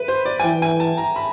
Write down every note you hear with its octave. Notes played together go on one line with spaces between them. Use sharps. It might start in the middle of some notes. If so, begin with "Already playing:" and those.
Already playing: B4
C5
D5
G#5
E3 G5
G#5
A5
A#5
B5